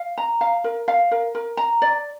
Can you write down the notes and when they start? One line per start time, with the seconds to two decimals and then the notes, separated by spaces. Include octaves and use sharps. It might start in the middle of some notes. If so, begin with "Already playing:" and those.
Already playing: F5
0.18 A#5
0.41 F5
0.64 A#4
0.88 F5
1.11 A#4
1.35 A#4
1.57 A#5
1.82 D5